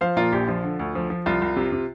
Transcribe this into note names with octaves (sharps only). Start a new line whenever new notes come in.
F3 C5 F5
A#2 F4 A#4
A#1 G4
F3 F4
D3
D2
F3
F3
C2 F4
C2
C3
C3